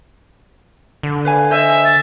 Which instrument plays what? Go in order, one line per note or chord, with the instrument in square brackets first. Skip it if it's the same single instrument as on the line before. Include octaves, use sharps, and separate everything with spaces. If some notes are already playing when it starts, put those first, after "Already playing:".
[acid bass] D3
[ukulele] B4 F5 G#5
[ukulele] C5 D#5 G#5 [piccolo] E5
[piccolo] A6